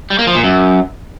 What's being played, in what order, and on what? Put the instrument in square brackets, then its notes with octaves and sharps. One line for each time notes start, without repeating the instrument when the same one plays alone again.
[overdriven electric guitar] G3
A#3
F3
A#2
F#2